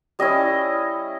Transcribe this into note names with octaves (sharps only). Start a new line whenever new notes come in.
G3 C#4 E4 D#5